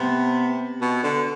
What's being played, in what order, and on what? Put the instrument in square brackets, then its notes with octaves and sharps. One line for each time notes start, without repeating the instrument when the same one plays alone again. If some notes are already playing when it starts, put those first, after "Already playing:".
Already playing: [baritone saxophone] C3 [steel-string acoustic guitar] B3
[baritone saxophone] B2
D3